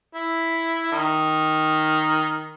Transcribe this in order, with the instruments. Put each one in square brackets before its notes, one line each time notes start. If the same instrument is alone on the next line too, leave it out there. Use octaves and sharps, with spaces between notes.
[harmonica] E4
D#3